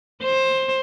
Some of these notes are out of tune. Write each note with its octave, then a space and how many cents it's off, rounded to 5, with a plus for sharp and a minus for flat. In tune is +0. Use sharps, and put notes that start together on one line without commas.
C5 +15